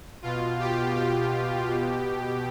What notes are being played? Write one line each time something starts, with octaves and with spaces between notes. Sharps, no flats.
B2 F4
G4
G4
B2